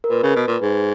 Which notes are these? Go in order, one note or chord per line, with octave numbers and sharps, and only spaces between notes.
A#4
A#2 B4
C#3
B2
A#2
G#2